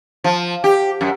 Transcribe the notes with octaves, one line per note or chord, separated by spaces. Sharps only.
F3
G4
F#2